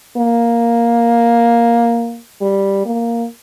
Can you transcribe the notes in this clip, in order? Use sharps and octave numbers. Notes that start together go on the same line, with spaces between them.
A#3
G3
A#3